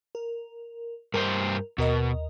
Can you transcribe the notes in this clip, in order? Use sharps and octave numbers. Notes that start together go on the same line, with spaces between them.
A#4
G2 G#4 A#4 C5
D#2 B2 A#4 D#5